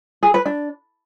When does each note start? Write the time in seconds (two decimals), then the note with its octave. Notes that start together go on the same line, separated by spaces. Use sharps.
0.23 G#4
0.34 B4
0.46 D4